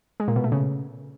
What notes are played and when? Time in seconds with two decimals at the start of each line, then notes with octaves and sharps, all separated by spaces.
0.20 G#3
0.28 A#2
0.36 B2
0.44 A3
0.52 C#3